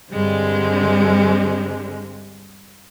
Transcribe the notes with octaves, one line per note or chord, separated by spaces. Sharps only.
G2 D3 G3 G#3 C4